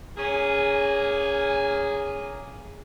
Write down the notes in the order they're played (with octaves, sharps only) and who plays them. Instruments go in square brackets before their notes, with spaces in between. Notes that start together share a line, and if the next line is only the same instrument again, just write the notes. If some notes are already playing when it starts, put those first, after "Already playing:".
[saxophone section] A#3 C#4 G#4